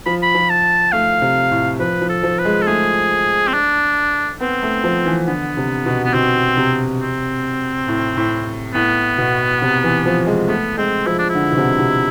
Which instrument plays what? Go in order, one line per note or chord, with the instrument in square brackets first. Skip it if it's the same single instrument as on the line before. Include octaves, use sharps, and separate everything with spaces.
[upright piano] F3 [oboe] B5
[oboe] B5
[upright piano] F3
[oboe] A5
[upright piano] A3 [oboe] F5
[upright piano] C3
A2
[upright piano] F3 [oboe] B4
[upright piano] F3
[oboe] A4
[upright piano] F3
[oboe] B4
[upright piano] G#3
[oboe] A4
[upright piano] A3 [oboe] G#4
[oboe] C4
D4
[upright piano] B3 [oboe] C4
[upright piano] A3
F3
E3
[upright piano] D3 [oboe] B3
[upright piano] C3
B2
[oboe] B3
[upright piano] B2 [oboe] C4
[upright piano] C3
[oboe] C4
[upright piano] A2
A2
[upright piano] A2 [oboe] B3
[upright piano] B2
C3
E3
F3
G#3
[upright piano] A3 [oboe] B3
[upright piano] G#3 [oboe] C4
[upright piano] F3 [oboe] E4
[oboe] D4
E4
[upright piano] D3
B2
C3
C3